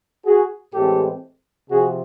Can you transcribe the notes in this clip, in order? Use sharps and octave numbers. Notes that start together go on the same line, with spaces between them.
F#4 G#4
A2 E3 G#3 C4 G4 A4
C3 F3 F#4 G#4